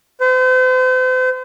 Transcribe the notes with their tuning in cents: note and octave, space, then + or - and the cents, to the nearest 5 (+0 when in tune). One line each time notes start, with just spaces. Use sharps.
C5 -40